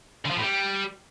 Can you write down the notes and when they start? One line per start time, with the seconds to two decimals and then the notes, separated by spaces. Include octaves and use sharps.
0.25 D3
0.31 F3
0.36 A2
0.42 G3